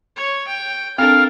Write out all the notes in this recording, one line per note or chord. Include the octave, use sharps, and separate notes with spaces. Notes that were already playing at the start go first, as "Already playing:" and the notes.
C#5
G5
C4 D4 A4 A#4 F5